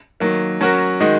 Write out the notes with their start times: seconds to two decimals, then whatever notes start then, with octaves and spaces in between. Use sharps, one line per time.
0.20 D#3 F#3 A#3
0.61 F#3 C#4 F#4 A#4
1.00 D#3 G#3 D#4 F#4